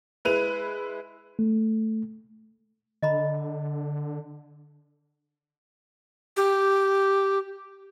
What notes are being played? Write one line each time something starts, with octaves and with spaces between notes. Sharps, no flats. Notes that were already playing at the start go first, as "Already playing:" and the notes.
G#3 E4 B4 D#7 F7
A3
D3 D#5 A#5 B5
G4